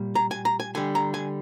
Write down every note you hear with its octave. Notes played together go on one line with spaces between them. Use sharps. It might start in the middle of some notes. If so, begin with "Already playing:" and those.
Already playing: A#2 G3
A#5
G#5
A#5
G#5
D3 G3 G#5
A#5
G#5